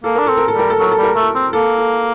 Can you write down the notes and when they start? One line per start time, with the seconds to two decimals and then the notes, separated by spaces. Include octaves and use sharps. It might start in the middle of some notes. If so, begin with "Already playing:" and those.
0.04 A#3 A4
0.15 D4 A#4
0.26 C4 A4
0.37 A#4
0.48 A4
0.54 G3
0.59 A#4
0.70 A4
0.79 F#3 A#4
0.92 A4
0.98 G3
1.03 A#4
1.14 A3 A4
1.35 C4
1.53 A#3 A4
1.78 A4